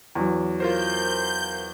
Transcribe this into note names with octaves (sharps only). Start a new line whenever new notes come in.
E2 F#3
F4 A#4 C5 G6